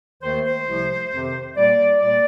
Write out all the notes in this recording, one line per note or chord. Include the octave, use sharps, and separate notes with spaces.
D#2 D#3 A3 C5
C5
C2 C3 F3 A3
F2 C3 D#3
A#2 G3 A#3 D5
A#2 G3 A#3 D5